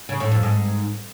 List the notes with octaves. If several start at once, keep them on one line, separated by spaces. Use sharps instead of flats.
C#3
A2
F2
G#2